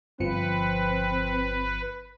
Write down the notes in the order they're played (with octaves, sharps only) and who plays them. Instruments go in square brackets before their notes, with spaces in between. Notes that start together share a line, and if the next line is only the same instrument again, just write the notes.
[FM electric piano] G1 F3 C#7 [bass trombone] C4 [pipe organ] B4